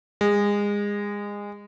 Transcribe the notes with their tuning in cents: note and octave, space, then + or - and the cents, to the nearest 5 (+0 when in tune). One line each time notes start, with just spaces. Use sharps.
G#3 -25